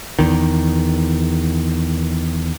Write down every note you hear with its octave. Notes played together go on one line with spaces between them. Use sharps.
E2 D#3